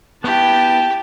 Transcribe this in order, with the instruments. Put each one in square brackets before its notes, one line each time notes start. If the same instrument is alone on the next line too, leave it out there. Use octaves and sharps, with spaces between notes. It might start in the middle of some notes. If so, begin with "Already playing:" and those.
[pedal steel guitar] B3 E4 [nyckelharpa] G4 [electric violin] G5 A5